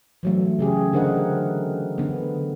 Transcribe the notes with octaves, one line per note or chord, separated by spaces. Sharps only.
E3 F#3 A3
C#3 G4 G#4
D3 D4 A#4 C5 D#5 F#5
D3 B3